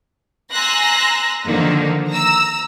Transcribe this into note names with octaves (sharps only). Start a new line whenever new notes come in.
G#5 A#5 C6 E6 F#6 A#6
D3 D#3 F3 A#3 D#4
A#5 E6